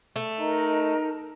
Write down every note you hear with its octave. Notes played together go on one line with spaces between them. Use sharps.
A3
D#4 A#4 D#5 A#5